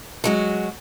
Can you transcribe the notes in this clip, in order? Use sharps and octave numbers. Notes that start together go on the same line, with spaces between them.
F#3 G#3 F#4